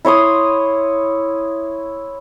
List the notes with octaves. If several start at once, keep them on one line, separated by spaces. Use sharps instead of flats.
E4 C#5 C6 D#6